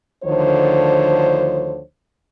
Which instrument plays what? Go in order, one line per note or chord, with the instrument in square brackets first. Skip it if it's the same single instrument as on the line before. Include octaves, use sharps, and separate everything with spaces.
[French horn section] D2 D3 D#3 F3 C5 C#5